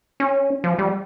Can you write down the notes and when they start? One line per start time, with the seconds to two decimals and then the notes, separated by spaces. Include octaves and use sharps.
0.20 C#4
0.64 F3
0.79 G3